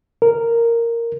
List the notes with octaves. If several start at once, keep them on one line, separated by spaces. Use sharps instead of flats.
A#4